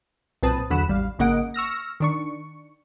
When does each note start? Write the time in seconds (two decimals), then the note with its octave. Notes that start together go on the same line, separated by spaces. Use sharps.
0.43 B1 A#2 C4 B4 A5 D#6
0.70 E2 D3 F#3 F#5 B5 E7
0.88 A1 G3 F5
1.19 G#1 C#3 A#3 D#5 F#5 D7
1.54 C#6 E6 F6 A#6
2.00 D#3 D4 C#6